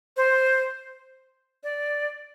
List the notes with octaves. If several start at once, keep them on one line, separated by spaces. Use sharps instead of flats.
C5
D5